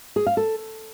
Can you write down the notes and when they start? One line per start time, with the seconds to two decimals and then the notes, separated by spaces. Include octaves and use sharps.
0.16 G#4
0.27 F5
0.37 A4